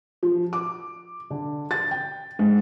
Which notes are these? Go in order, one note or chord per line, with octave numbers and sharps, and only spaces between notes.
F3
D6
D3
A6
G5
G#2